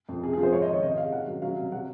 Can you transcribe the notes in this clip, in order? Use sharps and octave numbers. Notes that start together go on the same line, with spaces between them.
F2
C3 G#4
F3 G#4
C5
G#2 C#5
D#5
D#3
C#5
C3 D#5
G#3 F5
D#3 F#5
F#3
F#3 F5
C3
F#3 F#5